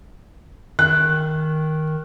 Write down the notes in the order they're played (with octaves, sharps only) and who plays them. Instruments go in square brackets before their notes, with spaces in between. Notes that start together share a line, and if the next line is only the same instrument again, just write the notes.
[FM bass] D#3 [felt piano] F#6